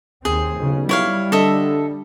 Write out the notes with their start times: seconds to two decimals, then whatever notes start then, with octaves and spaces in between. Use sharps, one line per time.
0.25 D#2 C4 G#4
0.60 B1 C#3
0.89 G3 E4 C#5 F5
1.32 D3 A4 D#5 E5